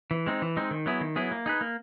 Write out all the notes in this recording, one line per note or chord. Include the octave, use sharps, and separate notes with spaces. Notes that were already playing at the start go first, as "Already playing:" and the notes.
E3
G#3 C4 D#4
E3
G#3 C4 D#4
D#3
F#3 B3 E4 G#4
D#3
F#3 B3 E4 G#4
A#3
D#4 G#4 B4
A#3